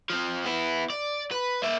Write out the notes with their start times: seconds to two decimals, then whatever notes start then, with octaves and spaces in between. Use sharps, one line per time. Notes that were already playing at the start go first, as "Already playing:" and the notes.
0.10 F3 C4
0.45 B3 E4
0.90 D5
1.31 B4
1.63 A#3 E5